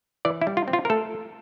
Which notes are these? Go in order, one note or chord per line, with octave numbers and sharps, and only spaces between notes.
E3 D5
E4
G3
F4
C4
F4
A#4
A3 A4